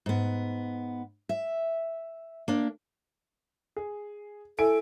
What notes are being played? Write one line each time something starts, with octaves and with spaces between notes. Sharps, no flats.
G#2 B3
E5
A#3 D4
G#4
E4 A4 G#5 D7